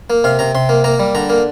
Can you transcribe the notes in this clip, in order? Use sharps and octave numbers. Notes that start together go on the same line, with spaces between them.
A#3
C3 F5
C3 A#5
C3 C6
A#3
A#3 A#5
G3
D3 A#5
A#3